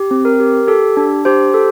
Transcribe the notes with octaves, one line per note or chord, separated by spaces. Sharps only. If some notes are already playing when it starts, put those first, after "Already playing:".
Already playing: G4
C4
A#4
G4
G4 A4
D4
G4 C5
A4